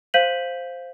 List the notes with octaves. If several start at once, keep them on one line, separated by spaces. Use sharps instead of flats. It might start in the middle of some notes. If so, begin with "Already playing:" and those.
C5 F5 G6 B6 D#7 F#7